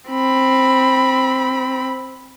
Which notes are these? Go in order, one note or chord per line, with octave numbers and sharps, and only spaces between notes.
C4 B5